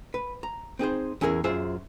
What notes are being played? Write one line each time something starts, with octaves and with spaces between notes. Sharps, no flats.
B4
A#5
C4 D#4 G#4 C5
E2 C#4 E4 G#4 A#4
F#2 F4 G#4 C5 E5